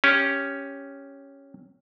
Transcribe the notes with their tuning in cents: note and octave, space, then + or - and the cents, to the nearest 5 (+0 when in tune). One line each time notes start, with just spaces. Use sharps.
C#4 +0 G4 +10